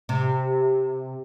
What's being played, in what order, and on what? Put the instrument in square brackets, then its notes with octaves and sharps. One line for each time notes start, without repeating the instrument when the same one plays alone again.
[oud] C3